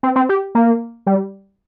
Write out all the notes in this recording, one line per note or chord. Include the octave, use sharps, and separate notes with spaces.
C4
C4
G4
A#3
G3